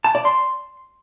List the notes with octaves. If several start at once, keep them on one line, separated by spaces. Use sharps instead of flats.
A5
D5
C6